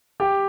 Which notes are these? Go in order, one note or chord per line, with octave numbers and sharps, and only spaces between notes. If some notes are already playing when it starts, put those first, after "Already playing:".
G4